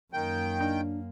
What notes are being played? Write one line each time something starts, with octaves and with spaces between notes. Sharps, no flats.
F#2 D#3 A#3 G5
D4